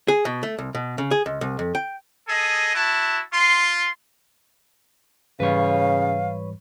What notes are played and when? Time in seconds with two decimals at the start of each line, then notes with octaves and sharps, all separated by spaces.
0.08 G#4
0.25 B2
0.43 A3
0.59 C2
0.75 B2
0.98 C#3
1.11 G#4
1.26 C#2
1.41 C2
1.59 F2
1.75 G5
2.28 G#4 A4 D#5
2.74 E4 F#4 A5
3.33 F4 C6
5.40 G#2 C#3 E3 G3 B4 C#5 F5